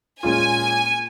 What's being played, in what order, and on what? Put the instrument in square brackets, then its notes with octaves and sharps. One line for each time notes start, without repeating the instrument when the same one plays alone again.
[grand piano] A#2 G#3 C#4 F4 [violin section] G#5